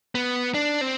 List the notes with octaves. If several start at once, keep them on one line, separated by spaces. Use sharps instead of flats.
B3
D4
C4